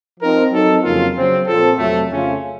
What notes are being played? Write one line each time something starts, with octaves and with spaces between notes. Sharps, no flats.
F3 C4 D#4 A#4
F#3 C4 D#4 A4
F2 C#3 F#3 A#3 F4
C#3 F#3 C4
A#2 F3 C4 F4 A4
F2 C3 F#3 A3
F2 C#3 A3 C#4 F4